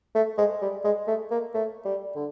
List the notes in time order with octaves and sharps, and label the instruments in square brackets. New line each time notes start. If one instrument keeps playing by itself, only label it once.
[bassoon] A3
G#3
G3
G#3
A3
A#3
A3
G3
D3